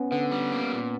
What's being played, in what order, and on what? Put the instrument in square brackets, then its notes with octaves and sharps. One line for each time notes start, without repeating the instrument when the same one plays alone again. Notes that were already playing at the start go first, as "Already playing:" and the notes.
Already playing: [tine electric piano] B3 C#4
[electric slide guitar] D3 [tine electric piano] B3
[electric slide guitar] G3
A#3
A#2